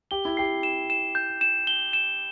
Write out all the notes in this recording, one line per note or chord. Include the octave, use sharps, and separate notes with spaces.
G4 G7
E4
G4 C7
E7
E7
G6
E7
G7
E7